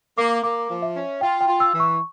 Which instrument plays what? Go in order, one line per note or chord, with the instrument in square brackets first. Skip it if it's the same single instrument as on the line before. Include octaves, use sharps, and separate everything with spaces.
[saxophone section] A#3 [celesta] D6
[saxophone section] A#3 [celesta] D6
[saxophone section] F3
[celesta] E5
[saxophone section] C#4
[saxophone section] F4 [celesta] G5
[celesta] G5
[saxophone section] F4
[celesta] E6
[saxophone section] E3
[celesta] C#6